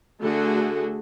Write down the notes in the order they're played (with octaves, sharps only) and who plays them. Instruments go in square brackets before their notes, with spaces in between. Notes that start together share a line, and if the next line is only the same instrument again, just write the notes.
[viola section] D3 A3 F#4 G#4